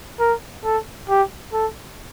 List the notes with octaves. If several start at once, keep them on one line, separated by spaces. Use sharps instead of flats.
A#4
A4
G4
A4